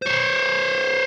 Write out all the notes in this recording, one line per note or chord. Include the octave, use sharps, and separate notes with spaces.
C5 C#5